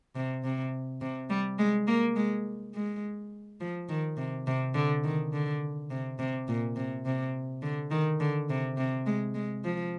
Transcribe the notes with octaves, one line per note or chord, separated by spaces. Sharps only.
C3
C3
C3
G3
G#3
A#3
G#3
G#3
F3
D#3
C3
C3
D3
D#3
D3
C3
C3
A#2
C3
C3
D3
D#3
D3
C3
C3
G#3
G#3
F3